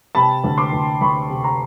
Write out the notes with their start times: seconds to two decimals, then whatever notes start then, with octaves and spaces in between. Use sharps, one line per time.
0.15 C3 A5 B5
0.44 D2
0.58 C6 D6
0.73 D2
1.01 D2 B5 C#6
1.30 C3
1.44 A#5 C6